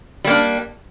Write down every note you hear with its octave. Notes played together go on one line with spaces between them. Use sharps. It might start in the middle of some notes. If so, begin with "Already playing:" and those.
G3 A#3 D4